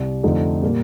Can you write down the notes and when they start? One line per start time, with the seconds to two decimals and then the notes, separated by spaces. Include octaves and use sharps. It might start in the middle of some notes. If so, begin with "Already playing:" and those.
Already playing: C2 C3
0.23 F2 D3 F3 A3 D#4
0.62 A#2 G3 A#3